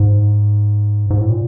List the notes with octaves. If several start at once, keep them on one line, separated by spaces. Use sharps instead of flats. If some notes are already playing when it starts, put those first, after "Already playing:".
Already playing: G#2
G#2
A2
A#2